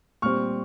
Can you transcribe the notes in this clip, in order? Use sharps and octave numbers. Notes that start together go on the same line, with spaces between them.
A#2 G3 C4 C#6 F6